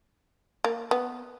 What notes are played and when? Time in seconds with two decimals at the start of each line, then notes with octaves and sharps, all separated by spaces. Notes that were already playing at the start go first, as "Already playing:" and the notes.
0.64 A#3
0.91 B3